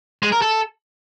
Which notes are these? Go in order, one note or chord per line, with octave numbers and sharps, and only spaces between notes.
G#3
A#4
A4